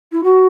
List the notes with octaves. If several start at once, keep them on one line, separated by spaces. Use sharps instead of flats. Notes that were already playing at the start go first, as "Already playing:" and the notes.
E4
F#4